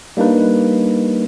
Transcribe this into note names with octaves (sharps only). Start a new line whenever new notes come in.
G3 A#3 D4 D#4 B4